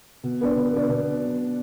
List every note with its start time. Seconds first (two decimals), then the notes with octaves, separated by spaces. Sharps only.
0.23 B2
0.41 B3 D4
0.56 B2
0.73 B3 D4
0.89 B2